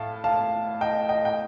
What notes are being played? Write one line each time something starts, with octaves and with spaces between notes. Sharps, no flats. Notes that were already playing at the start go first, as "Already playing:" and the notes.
Already playing: A2 F5 A5
F5 A5
D#5 G5
D#5 G5
G5